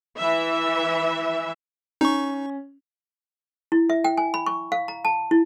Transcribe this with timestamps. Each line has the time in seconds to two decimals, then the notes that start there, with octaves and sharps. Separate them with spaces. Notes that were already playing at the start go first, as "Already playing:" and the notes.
0.17 E3 E5
2.01 C#4 D#4 C#6
3.72 E4
3.90 E5
4.04 G5
4.17 G#5
4.34 B5
4.46 C#6
4.72 F5
4.88 A#5
5.05 A5
5.31 E4